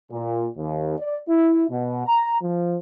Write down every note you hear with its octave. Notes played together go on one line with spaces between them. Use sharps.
A#2
D#2
D5
E4
B2
A#5
F3